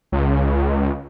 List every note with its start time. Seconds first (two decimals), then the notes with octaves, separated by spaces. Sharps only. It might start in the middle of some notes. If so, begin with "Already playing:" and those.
0.12 C#2